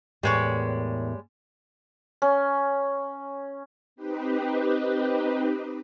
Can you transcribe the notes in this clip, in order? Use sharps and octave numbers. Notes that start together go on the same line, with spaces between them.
E2 A2 G3 G#3 A#4 C#5
C#4
C4 D#4 G4 B4